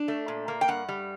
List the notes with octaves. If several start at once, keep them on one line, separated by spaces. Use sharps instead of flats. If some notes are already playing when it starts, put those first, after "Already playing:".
Already playing: D4
A3
A#2
A#3
G5
G2 F#5
G3